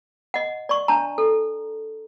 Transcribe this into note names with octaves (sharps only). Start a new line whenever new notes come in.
D#5 F#5
D5 C#6
D4 A5 A#5
A4